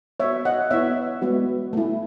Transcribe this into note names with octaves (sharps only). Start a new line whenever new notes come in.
B3 F#4 C#5 E5
D#5 F#5
B3 E4 C#5 E5
G#3 B3 F#4
A3 E4